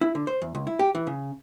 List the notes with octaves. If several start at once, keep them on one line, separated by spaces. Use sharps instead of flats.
E4
D3
C5
E2
C#2
E4
G4
E3
C#3